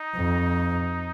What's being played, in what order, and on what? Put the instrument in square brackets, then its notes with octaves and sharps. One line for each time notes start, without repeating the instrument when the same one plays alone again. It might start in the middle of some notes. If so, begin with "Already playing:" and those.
Already playing: [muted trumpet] D#4
[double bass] F2